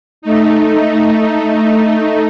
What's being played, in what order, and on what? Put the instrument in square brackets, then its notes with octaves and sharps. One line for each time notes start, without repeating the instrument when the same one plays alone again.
[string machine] A3 D#4